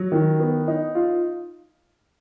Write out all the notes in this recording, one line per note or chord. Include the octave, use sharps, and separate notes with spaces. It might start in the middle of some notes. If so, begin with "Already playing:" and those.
Already playing: F#3
D#3
B3
D#4
F4